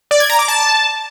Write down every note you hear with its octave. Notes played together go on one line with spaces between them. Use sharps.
D5
G#6
A#5
D6
A5